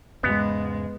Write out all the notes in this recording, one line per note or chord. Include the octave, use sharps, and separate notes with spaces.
E2 G#2 C#3 G#3 B3